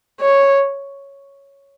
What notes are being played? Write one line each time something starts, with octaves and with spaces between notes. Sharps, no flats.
C#5